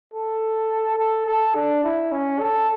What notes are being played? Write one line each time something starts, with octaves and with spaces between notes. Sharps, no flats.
A4
A4
A4
D4
E4
C#4
A4